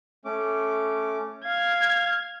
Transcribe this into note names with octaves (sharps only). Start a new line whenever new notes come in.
A3 C#4 D6
F5 F6 G#6